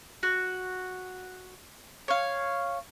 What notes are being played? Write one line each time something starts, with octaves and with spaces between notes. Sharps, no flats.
F#4
C#5 F5